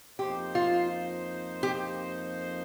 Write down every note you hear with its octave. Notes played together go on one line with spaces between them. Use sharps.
F2 F3 A#3 D#4 G4 C5
F4
G4